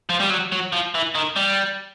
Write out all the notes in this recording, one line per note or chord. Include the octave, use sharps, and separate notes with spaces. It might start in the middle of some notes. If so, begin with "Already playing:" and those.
F3
G3
F#3
F#3
F3
E3
D#3
G3